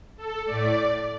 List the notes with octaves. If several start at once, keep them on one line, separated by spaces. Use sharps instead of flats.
A4
A2 A3 D5